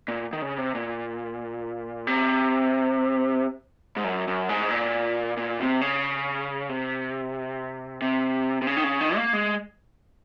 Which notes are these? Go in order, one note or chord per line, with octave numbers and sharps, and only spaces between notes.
A#2
D#3
C#3
C3
A#2
C3
G#2
F#2
F#2
G#2
A#2
A#2
C3
C#3
C3
C3
C3
C#3
D#3
C#3
D#3
A#3
G#3